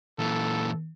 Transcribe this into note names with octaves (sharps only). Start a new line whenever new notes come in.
A#2 E3 A4